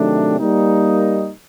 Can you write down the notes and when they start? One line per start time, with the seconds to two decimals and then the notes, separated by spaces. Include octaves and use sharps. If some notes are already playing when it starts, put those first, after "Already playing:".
Already playing: C3 D#3 F#3 A3 D4
0.38 G3 A#3 D#4